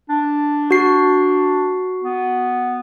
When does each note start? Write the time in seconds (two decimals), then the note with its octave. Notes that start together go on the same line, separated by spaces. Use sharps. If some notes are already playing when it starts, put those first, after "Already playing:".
0.10 D4
0.71 F#4 C7
2.03 B3